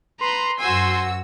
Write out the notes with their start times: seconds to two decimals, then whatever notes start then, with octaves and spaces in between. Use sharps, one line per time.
0.21 B4 A#5 C6
0.60 F#2 F#4 C5 G#5 E6